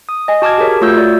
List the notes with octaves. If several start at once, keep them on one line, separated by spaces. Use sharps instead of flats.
D#6
D#5 G#5
F#4 A5 D6 F6 G#6
G4 G#4 A#4 C#5
A3 F4 F#4 C#5 E6 G6
F4 D5